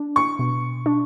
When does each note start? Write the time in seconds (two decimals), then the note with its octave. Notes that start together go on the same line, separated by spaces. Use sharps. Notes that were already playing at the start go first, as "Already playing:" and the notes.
Already playing: D4
0.16 C#6
0.39 B2
0.86 D4